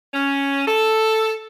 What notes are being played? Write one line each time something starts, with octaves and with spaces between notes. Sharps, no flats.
C#4
A4